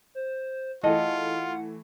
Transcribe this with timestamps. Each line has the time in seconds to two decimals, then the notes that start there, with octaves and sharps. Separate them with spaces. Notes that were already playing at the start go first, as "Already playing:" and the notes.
0.15 C5
0.83 E3 A3 F4 G#4 A4 D#5 F#5